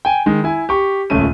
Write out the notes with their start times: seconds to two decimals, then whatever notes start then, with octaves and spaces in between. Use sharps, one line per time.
0.05 G5 G#5
0.26 D#3 G#3
0.44 E4 G#5
0.69 G4 C#6
1.10 D#1 C#2 A3 C#4 D#7